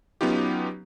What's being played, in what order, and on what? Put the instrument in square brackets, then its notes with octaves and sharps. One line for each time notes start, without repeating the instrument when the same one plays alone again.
[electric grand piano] F#3 B3 C#4 D#4 F4 G4